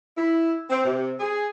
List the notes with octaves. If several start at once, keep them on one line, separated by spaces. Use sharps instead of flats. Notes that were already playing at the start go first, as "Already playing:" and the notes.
E4
C4
C3
G#4